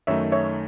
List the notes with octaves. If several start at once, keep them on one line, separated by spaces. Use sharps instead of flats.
F#2 D#3 A3 D#4 C#5 E5
C#5 E5